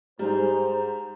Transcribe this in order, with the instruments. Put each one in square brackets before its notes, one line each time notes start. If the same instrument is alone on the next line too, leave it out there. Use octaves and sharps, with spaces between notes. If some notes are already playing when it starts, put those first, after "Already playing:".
[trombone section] G#2 [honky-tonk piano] G3 [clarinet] C5 [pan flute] A#5